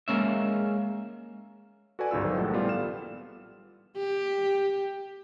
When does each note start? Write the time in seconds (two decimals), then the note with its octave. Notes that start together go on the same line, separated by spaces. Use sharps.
0.08 G#3 A#3 C#4 E5
1.99 F#4 A4 B4 D5 G#5
2.11 G1 C#2 G#2 F4 E6
2.23 D#3 F#3 F#4 C5
2.37 A#1 A2 G3 A4 F#5
2.54 G3 B3 F4 D5
2.69 B3 F6 E7
3.97 G4